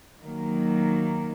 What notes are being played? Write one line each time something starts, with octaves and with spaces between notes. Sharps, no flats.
D#3 F#3 A#3